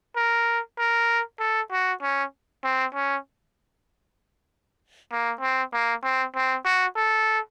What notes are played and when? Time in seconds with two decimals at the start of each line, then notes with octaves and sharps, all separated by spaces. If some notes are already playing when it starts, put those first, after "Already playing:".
0.16 A#4
0.78 A#4
1.39 A4
1.71 F#4
2.02 C#4
2.64 C4
2.95 C#4
5.12 A#3
5.41 C4
5.73 A#3
6.03 C4
6.35 C4
6.65 F#4
6.96 A4